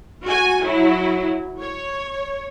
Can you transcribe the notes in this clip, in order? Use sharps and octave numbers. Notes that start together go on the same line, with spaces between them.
F#4 G#5
F#3 E4
C#5